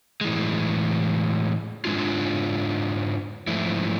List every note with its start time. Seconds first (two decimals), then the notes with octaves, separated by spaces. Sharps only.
0.21 A2 E3 G#3
1.85 G#2 G#3 D4 F4
3.47 G#2 F3 A3 E4